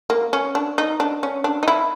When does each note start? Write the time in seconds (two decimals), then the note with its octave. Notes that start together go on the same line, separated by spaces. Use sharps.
0.10 A#3
0.33 C#4
0.55 D4
0.78 D#4
1.00 D4
1.23 C#4
1.44 D4
1.63 D#4
1.68 E4